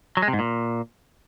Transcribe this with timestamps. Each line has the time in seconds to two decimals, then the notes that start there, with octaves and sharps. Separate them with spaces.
0.17 F#3
0.22 G#3
0.28 C3
0.33 G#2
0.39 A#2